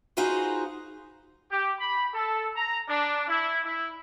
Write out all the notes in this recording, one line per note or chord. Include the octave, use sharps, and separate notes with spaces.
D#4 F4 F#4 G#4 B4 C5
G4
B5
A4
A#5
D4
E4
E4